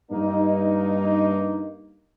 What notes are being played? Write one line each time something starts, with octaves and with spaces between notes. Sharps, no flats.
G2 A#3 D#4